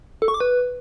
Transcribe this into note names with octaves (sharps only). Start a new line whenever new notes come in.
A4
C#6
D6
B4